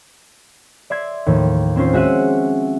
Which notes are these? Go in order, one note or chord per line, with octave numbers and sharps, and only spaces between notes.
D5 E5 C6 G#6
D#2 A2 F3
C4 C#4 F4 C5
G#3 F#4 E5 F#5 D#7